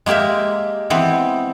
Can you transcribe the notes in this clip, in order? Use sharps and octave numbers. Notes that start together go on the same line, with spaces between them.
G#3 A#3 G4 A#4 E5
E3 B3 C4